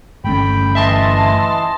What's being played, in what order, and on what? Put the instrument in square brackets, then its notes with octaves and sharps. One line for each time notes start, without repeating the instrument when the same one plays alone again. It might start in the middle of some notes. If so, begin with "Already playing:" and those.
[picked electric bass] G1 A3 C#4 [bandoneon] G5 B5
[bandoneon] E3 D#5 [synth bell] E5 A5 C6